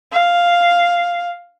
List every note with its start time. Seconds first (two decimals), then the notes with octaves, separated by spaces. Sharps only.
0.12 F5